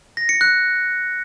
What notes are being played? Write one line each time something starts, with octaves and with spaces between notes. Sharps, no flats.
A#6
C#7
F#6